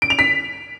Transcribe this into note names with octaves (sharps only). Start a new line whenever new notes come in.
D7
F7
B6